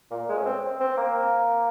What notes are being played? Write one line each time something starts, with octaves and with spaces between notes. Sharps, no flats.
A#2
G#3
C#4
C4
C4
A#3